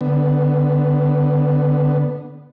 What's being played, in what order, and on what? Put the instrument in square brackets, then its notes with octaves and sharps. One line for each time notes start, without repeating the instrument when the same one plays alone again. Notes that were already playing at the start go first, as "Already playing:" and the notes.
[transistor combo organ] D3 B3